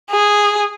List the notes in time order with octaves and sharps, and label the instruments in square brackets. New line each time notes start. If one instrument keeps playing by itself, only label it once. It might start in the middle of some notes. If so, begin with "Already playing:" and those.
[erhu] G#4